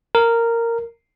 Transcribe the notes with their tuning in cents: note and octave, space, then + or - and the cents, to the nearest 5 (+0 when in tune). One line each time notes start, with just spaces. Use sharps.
A#4 -10